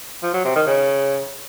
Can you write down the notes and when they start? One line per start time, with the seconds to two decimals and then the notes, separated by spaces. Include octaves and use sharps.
0.23 F3
0.34 F#3
0.45 C3
0.56 D#3
0.67 C#3